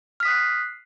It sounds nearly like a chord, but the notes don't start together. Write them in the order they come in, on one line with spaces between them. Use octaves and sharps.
F6 B6 D#6 F#6 C7